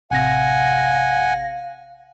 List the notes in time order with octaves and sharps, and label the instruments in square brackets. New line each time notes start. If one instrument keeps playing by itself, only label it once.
[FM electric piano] A1 C3 A#6 [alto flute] F5 [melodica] F#5 G#5